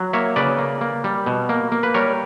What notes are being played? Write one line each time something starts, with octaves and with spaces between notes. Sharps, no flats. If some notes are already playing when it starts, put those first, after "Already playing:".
Already playing: F#3
A#3 C#5 E5
C#3 B4 D5
A#3
A#3
G3
B2
A#3
A#3
B4
G3 A#4 C#5